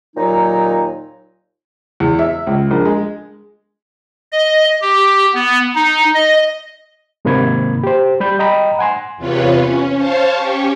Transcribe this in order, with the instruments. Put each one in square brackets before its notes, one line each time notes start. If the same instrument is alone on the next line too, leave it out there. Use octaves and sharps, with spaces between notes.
[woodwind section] D#2 A#2 F#3 D#4
[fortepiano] E2
E5
C#2
A#1
G#3
[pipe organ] D#5
G4
B3
D#4
D#5
[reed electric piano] G#2 C3 D#3 A#3 B5 G#6
G4 C5
G3 B5 G6
D#5 G5 A#5 B5
F#5 G#5 C6
[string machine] E2 C3 F4 B4 C#5
C#4
C5 C#5 F5 A5
C#4 G4 C#5